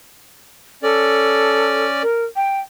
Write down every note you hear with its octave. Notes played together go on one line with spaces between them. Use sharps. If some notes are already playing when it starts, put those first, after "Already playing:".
C#4 A4 D5
A#4
G5